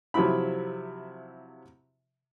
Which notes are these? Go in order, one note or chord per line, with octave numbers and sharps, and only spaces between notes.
C3 F3 F#3 E4 B5